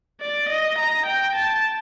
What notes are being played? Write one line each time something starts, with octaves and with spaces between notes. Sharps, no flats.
D5
D#5
A#5
G5
A5